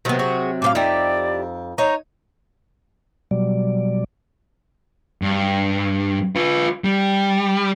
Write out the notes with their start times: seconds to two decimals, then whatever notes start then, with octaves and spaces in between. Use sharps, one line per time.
0.05 C3 D#3 F#3 B3
0.19 F#4 G#4
0.62 A2 G4 F5 D6
0.75 F2 D#4 E4 G4 D5
1.78 D#4 C#5 A#5
3.31 B2 F#3 G3 D5
5.22 G2
6.36 F4 B4
6.84 G3